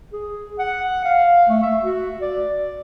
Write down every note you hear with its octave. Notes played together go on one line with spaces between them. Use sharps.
G#4
F#5
F5
A3
E5
F#4
D5